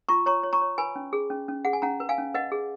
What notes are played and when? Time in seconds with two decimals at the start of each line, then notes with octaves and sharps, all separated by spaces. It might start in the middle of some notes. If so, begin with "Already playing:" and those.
0.09 F4 A#5 C#6
0.26 C#5 A#5 C#6
0.43 C#5
0.53 A#5 C#6
0.62 C#5
0.78 B4 G#5 B5
0.96 C#4
1.13 G#4
1.30 C#4
1.48 C#4
1.65 G#4 F#5
1.73 G#5
1.82 C#4 F#5 A#5
2.00 B4
2.09 F5 G#5
2.18 C#4
2.34 B4 D#5 F#5
2.52 G#4